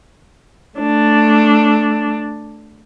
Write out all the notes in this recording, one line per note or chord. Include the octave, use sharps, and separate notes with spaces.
A3 D4